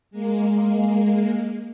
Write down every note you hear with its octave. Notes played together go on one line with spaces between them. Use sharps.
G#3 A#3